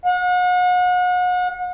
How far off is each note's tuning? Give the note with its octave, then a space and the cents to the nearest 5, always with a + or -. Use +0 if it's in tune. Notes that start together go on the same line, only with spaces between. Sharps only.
F#5 -40